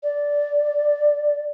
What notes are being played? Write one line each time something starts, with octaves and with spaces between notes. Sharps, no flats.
D5